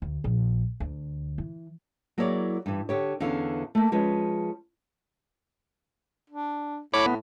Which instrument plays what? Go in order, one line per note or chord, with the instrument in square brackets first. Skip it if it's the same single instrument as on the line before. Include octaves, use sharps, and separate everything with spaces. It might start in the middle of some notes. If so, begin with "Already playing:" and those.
[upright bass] D2
A#1
D2
E3
[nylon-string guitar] F#3 A#3 E4 G#4 C#5 D5
G2 E3
D3 G4 C#5
E2 D3 E3 C#4 F5
A3 A#3
F3 G#3 C#4 B4
[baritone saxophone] D4
[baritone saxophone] A2 [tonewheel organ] C#5 B5 D6
[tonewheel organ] B3